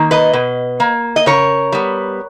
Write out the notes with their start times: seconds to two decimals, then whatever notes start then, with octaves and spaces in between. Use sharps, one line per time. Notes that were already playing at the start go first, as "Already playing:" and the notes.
Already playing: D#3 A#3
0.11 B4 D#5
0.33 B2
0.80 A#3
1.16 D#5
1.26 C#3 A#4 C#5
1.72 G3 B3